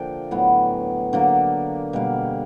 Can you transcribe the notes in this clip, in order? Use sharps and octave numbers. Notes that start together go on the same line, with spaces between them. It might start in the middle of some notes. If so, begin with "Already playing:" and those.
Already playing: D3 F3 A#3 D4 G5
A2 F#3 B3
D3 F#3 A#3
B2 G3 A#3